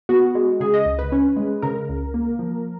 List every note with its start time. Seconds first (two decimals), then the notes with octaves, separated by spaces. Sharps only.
0.09 B3 F#4
0.35 G#3
0.60 C#3 G#4
0.74 D#5
0.85 C#2
0.99 B4
1.12 C#4
1.37 G#3
1.62 C#3 A#4
1.89 C#2
2.14 A#3
2.39 F3